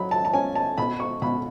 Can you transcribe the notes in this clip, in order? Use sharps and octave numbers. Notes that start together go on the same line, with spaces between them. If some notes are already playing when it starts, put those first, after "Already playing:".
Already playing: F#3 B5
A5
A5
C#4 G#5
A5
B2 B5
C#6
B2 B5